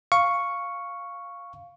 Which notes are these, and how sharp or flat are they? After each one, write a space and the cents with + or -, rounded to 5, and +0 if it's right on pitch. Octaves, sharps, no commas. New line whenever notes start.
F5 +0 C#6 +0